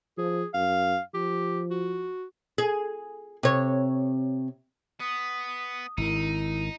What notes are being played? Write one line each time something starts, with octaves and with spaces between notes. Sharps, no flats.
F3 G#4
F#2 F5
F3 G4
F#4
G#4
C3 C#5
B3 D#6
G#1 D#3 D#4 E4